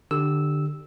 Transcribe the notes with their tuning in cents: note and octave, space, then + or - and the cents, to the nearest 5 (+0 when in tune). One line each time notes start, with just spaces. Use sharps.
D3 +20 G4 +0 E6 -10